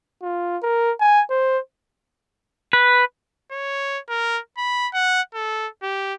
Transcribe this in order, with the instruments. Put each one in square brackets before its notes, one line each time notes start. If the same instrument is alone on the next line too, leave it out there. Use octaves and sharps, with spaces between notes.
[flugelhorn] F4
A#4
G#5
C5
[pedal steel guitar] B4
[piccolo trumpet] C#5
A#4
B5
F#5
A4
G4